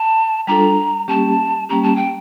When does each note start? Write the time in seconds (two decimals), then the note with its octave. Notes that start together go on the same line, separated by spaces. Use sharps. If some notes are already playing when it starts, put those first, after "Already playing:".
Already playing: A5
0.47 G3 D4 F4 A4 A#5
1.08 G3 A#3 C#4 G4 A5
1.69 G3 A#3 C#4 G4 A#5
1.83 A5
1.96 G5